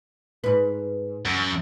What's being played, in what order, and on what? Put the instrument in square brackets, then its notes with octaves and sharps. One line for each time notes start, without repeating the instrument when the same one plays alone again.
[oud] G#2 B4
[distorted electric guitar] F#2